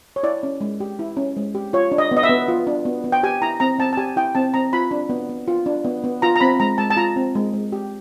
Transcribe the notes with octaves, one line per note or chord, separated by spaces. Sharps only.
C#5
E4 D5
C#4
G#3
G4
E4
C#4
G#3
G4
F4 C#5
D4
D#5
B3
D#5
E5
B3
F4
D4
B3
B3
G5
G4 G#5
E4 A#5
C4 A#5
C4 A5
A5
G4 G#5
E4 G5
C4 A5
C4 A#5
F4 B5
D4
B3
B3
F4
D4
B3
B3
F4 A#5
A#5
C4 B5
G#3 A#5
G#3 A5
A5
F4 A#5
C4
G#3
G#3
G4